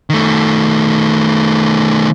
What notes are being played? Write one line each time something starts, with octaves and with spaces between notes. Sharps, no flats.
D#3 A3